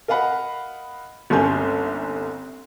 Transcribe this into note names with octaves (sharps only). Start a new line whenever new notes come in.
A#4 D#5 F5 F#5 B5
G1 C2 A#3 C#4 G#5 G6